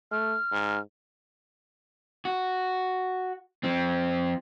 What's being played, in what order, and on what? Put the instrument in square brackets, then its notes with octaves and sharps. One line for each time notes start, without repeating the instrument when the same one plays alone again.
[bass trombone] A3 [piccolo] F6
[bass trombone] G#2
[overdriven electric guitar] F#4
F3 C4